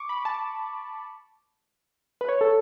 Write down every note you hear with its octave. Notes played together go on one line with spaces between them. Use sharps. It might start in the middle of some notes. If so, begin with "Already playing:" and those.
Already playing: C#6 D6
B5
A5
B4
C#5
A4